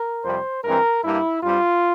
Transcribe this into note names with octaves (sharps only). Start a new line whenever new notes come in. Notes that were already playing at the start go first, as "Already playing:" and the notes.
Already playing: A#4
F2 C3 G3 C5
G2 E3 G#3 C4 A#4
G2 G3 A#3 E4
G2 G3 C4 F4